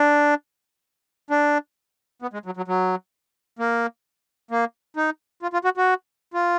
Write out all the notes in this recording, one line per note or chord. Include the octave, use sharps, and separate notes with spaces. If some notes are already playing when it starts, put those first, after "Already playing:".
Already playing: D4
D4
B3
G#3
F#3
F#3
F#3
A#3
A#3
D#4
F4
F4
F#4
F#4
F4